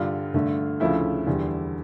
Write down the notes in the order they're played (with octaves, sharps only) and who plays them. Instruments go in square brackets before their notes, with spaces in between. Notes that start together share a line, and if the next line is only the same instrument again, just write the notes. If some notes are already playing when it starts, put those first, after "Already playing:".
Already playing: [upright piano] G2 D3 G3 F4
G2 D3 A3
D2 C#3 F3 A3 E4
E2 D3 G3